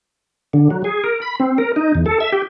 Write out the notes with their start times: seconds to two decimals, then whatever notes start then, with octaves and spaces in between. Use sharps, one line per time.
0.53 D3
0.70 F#3
0.84 G#4
1.04 A#4
1.22 B5
1.40 C4
1.58 A#4
1.76 D#4
1.95 E2
2.06 A4
2.20 E5
2.32 G4